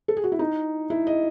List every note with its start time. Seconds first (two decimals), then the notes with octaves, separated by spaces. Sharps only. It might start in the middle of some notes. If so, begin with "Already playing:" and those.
0.08 A4
0.17 G#4
0.24 F#4
0.32 E4
0.39 D#4
0.90 E4
1.07 D#5